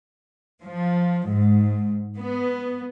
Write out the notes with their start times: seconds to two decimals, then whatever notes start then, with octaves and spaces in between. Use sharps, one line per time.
0.63 F3
1.27 G#2
2.17 B3